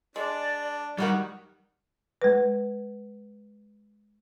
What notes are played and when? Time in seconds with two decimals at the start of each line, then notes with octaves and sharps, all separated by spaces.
0.16 G#3 D4 D5
0.98 D#3 F#3 G3 A#3 F#4 F#5
2.22 G#3 B4